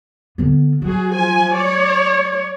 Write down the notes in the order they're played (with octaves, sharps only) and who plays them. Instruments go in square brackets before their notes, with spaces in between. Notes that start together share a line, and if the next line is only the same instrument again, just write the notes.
[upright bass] D3 B3
[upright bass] F#3 [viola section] F#4 G#4
[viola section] F3 G#5
C#5 D5